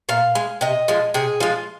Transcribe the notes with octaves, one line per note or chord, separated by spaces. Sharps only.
A#2 F5
G#3
C3 D#5
F3 G#3
C3 G#4
F3 G#3 F4